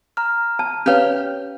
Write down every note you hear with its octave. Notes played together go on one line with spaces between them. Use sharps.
A#5 F6
A5
C#4 G4 B4 C#5 F5